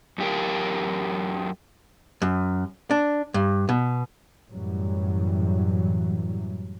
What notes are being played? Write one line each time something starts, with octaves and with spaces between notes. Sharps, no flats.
F#2 G4 A#4
F#2
D4
G2
B2
F#2 A2 E3 F#3 G3